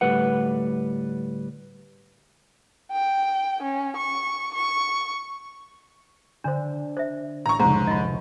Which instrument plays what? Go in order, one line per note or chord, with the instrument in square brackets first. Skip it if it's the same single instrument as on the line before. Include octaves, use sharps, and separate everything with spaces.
[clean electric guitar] D2 A2 G3 B4 F#5
[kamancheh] G5
C#4
C#6
C#6
[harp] D3 [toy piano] D4 C5
[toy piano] C5 E5
[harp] A1 [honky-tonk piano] A#5 C#6
[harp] F1 C#2 C3 [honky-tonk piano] G#2 [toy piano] C5 A#5
[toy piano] F4 D#5